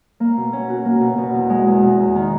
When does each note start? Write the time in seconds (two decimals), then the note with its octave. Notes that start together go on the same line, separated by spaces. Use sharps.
0.20 A#3
0.37 B2
0.53 C#4
0.69 F#4
0.85 A#3
1.01 B2
1.18 B2
1.34 E2
1.50 G#3
1.67 E2
1.82 B2
1.99 E2
2.15 D#3